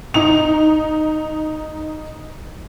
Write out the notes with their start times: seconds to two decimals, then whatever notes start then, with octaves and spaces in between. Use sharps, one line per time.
0.14 D#4 F7